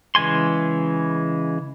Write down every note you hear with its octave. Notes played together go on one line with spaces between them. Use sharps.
C#3 E3 G#3 G#5 C6